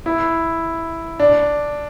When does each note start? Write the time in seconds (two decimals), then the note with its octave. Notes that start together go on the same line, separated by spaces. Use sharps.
0.06 E4
1.20 D4